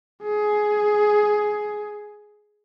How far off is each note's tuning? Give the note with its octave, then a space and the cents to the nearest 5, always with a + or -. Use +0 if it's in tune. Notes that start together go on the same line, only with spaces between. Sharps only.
G#4 +10